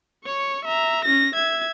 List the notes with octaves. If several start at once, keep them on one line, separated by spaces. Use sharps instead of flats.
C#5 C#6
E5 A#5
C#4 A#6
E5 G#6